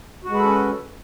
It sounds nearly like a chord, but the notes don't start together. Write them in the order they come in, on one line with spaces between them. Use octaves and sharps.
F#4 G#3 B4 A4 C#4